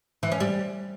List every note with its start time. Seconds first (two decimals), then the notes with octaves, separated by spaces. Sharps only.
0.23 E3
0.32 C#4
0.40 G3